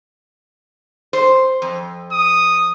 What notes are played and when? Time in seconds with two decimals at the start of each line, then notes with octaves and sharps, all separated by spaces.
1.13 C5
1.62 F2
2.12 D#6